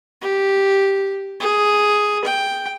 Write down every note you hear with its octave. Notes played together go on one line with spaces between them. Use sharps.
G4
G#4
G5